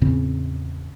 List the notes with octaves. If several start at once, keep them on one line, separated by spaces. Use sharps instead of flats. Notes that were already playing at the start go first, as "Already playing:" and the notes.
E2 A2 C#3 C4